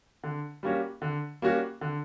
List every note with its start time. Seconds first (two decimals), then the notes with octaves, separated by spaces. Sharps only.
0.23 D3
0.63 G3 A#3 C#4 F#4
1.02 D3
1.42 G3 A#3 C#4 F#4
1.81 D3